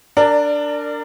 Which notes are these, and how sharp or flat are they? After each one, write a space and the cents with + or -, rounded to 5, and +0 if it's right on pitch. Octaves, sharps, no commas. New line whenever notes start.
D4 +0 A#4 -25 D5 +20